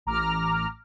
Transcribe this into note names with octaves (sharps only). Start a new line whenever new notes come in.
A1 A#5 D6 F6